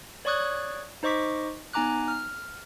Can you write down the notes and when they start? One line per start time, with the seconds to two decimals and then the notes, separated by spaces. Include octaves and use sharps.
0.25 C#5 D5 C#6 D#6 F#6 G#6
1.03 D#4 C5 D#5 C#6 D6 B6
1.74 B3 D#4 G#5 A#5 D6 F#6
2.08 F6